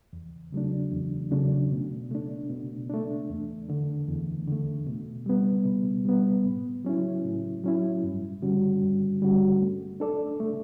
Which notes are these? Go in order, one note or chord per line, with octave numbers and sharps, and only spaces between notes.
E2
C#3 F#3 A3 D4
E2
C#3 F#3 A3 D4
B2
A3 D4
B2
A3 D4
E2
D3 A3
E2
D3 A3
B2
G3 B3
B2
G3 B3
A2
F#3 C#4 E4
A2
F#3 C#4 E4
G2
D3 G3 C#4 F#4
G2
D3 G3 C#4 F#4
A3
D4 A4 D5
A3